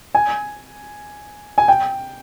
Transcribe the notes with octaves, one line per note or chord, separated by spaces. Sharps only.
G#5
G#5
G5